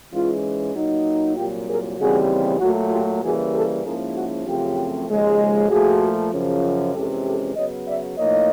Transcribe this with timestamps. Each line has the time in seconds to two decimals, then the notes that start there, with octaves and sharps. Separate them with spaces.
0.12 G#2 E3 G#3 C#4 F4
0.74 A#2 F#3 A#3 D#4
1.36 C2 A#2 F#3 F4 G4
1.68 G#4 A#4
1.98 D#2 C#3 E3 G3 C4 F#4 G#4
2.60 A#2 F#3 A3 F#4
2.91 F4 G4
3.22 C#3 E3 G3 A#3 F#4 G#4
3.53 G4 A4
3.84 G#2 F3 A#3 C#4 E4 G#4 A#4
4.15 F#4 G#4
4.46 F#2 C#3 F3 A3 C4 F4 G4
5.08 D#2 C#3 F3 G#3
5.70 A#2 F3 A3 F#4 G#4
6.32 F#2 C#3 F3
6.94 F2 C3 E3 G#3 C#4 G4 A4
7.25 G4 A4
7.56 C#3 F#3 B3 C#5 D#5
7.87 D5 E5
8.17 A2 F3 A#3 D#4 C#5 D#5